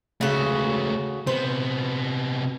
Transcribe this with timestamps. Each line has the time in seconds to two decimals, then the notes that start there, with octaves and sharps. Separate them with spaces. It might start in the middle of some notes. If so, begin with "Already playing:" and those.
0.21 C#2 C#3 A3 F#4
1.27 C3 B3 C5